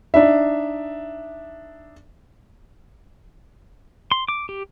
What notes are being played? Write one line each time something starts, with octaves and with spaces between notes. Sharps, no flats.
D4 D#4 E5
C6
D6
G4